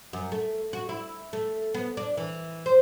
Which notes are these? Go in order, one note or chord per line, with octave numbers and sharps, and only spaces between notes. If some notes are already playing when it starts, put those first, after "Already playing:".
F#2
A3
F#4
E4
A3
B3
D4
E3
C5